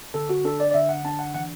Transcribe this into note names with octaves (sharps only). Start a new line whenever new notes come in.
D3 A4
F#4
D4 A4
D5
D5
D3 E5
F#5
D4 A5
F#5
E3 F#5